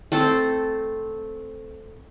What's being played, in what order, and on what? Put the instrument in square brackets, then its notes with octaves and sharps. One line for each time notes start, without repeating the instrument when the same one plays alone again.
[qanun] A3 C4 A4